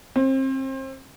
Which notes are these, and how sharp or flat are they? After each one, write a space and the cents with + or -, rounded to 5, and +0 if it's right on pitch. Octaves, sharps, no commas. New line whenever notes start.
C4 +30